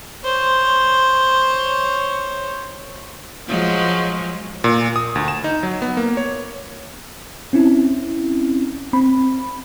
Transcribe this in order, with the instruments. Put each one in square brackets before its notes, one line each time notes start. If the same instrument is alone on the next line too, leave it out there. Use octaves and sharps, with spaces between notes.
[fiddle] C5 C#5
[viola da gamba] F3 F#3 G#3
[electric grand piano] A#2
D#6
D2
E7
D#4
F#3
B3
A#3
C#5
[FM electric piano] C4 C#4 E4
C4 B5